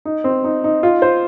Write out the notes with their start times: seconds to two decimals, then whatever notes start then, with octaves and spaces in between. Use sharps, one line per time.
0.05 D#4
0.24 C4
0.44 D#4
0.64 D#4
0.83 F4
1.02 C5